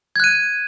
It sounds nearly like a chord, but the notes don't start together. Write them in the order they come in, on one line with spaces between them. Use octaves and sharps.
G#6 F#6 D#7